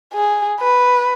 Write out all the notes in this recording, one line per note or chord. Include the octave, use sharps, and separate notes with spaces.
G#4
B4